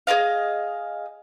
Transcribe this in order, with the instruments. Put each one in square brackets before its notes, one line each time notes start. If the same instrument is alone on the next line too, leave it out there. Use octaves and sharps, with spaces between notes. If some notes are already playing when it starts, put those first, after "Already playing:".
[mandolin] G#4 A#4 D#5 F5